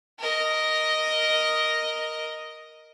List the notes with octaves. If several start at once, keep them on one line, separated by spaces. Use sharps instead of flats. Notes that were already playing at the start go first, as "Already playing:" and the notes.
A#4 D#5